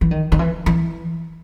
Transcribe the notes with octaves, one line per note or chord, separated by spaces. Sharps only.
E3
D#3
D#3
E3
E3